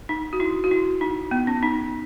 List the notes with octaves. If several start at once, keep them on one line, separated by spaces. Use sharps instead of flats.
D#4
F#4
E4
F#4
E4
D#4
B3
C#4
D#4